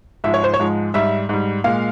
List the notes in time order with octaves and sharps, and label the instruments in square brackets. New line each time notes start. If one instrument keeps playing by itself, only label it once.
[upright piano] G#2 F3 G#3 E5
C#5
C5
C#5
G#2 F3 G#3
G#2 G3 E5
G#2 G3
A#2 G#3 F5